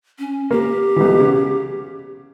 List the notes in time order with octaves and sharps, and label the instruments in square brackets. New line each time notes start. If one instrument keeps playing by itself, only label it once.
[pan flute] C#4
[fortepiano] A#3 [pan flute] G4
[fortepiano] B1 B2 E3
C#3